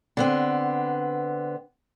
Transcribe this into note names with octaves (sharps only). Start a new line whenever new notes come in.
D3 B3 C4